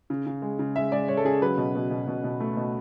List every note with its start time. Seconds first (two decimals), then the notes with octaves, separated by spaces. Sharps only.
0.10 C#3
0.26 C#3
0.42 G#3
0.59 C#3
0.76 G#3 E5
0.92 G#3 D5
1.08 G#3 C#5
1.17 A4
1.25 C#3 G#4
1.42 F#3 B4
1.58 B2
1.75 B2
1.91 B2
2.08 B2
2.24 B2
2.40 A3
2.57 B2